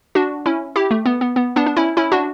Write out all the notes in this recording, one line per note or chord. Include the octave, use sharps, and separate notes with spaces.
D4 F#4
C#4 E4
E4 G4
A3
B3
B3
B3
B3 D4
D4
C#4 E4
C#4 E4
D4 F#4